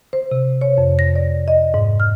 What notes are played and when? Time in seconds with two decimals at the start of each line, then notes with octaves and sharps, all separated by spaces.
0.13 C5
0.31 C3
0.61 C#5
0.78 F2
0.99 A#6
1.16 D5
1.48 D#5
1.74 G#2
2.00 F6